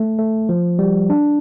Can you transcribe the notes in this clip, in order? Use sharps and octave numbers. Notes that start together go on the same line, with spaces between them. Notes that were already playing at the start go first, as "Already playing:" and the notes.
Already playing: A3
A3
F3
G3
D4